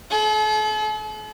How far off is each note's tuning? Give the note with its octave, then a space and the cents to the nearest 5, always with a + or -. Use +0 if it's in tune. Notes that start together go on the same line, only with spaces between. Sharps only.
A4 -45